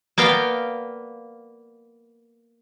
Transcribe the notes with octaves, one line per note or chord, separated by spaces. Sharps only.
A#3 B3 D5 F5 G5